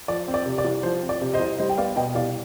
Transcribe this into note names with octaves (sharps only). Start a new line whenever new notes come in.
F3 D5
C4
D5
C3
D5
C2
F3 C5
C4
D5
C3
C5 D#5
C2
G3 C5 D#5
G5
B3 D5 F5
B2 D#5 G5
C2 D5 F5